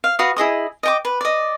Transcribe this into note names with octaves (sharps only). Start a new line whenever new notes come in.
F5
F#4 B4 F5 D#6
E4 G#4 D#5 D#6
D#5 G5 D6
B4
D5 D#5